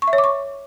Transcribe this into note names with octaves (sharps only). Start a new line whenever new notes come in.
C#6
E5
C#5
D6
C#6